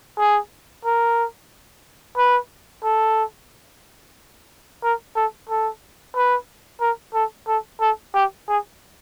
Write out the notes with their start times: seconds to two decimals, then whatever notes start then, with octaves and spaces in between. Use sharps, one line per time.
0.19 G#4
0.85 A#4
2.17 B4
2.84 A4
4.83 A#4
5.16 A4
5.49 A4
6.16 B4
6.81 A#4
7.14 A4
7.48 A4
7.81 A4
8.14 G4
8.48 G#4